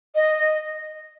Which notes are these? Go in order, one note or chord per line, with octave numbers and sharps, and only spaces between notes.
D#5